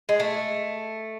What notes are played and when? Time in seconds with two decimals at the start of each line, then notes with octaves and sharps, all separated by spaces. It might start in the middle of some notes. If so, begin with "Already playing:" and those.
0.09 G#3
0.20 A3